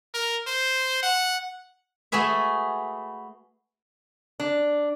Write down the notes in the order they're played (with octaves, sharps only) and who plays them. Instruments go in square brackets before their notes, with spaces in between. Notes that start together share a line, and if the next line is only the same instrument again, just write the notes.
[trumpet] A#4
C5
F#5
[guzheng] A3 F#4 G#4 B4 E5
[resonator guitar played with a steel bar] D4